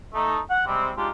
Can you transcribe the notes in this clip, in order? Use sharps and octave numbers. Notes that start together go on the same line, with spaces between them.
A3 D#4
F#5
C3 G3 G#3 C4
G#3 D4 D#4 F4 G4